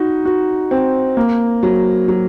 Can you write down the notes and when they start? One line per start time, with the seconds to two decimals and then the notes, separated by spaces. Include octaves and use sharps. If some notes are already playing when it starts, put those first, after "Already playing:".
Already playing: D#4 F#4
0.25 F#4
0.71 C4
1.17 A#3
1.63 F#3
2.08 F#3